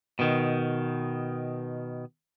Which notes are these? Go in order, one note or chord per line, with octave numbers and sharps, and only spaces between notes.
B2 D#3